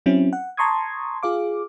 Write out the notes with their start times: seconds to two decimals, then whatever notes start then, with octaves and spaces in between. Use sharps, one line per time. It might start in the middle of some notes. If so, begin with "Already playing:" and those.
0.06 F#3 C4 C#4 E4
0.33 F#5
0.57 A5 A#5 C6 C#6 D#6 G#6
1.23 F4 G#4 F5 D6